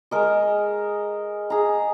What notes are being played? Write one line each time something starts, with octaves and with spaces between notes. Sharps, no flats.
G#3 A#4 D#5
G#4 A#5